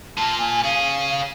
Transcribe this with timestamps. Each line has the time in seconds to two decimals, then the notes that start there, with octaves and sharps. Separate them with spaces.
0.18 A#2 F4 A5
0.38 G#5
0.64 C#4 G#4 F5